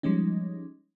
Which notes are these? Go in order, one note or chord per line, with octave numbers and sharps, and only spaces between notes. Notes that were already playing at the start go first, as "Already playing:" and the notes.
F3 G3 G#3 C#4 D#4